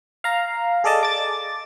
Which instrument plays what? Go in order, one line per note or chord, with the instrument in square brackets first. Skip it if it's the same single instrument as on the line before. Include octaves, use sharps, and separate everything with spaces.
[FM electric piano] F5 A#5
G#4 A4 D5 D#5 A5
D6 A6